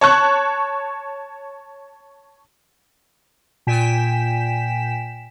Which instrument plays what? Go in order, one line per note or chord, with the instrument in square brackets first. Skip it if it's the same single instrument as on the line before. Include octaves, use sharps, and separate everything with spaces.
[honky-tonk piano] C#5 A5 C#6 F#6
[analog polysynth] A#2 G5 G#5 B6 E7